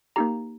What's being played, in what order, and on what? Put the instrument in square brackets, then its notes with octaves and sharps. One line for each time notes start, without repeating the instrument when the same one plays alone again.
[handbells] A#3 D#4 G4 A#5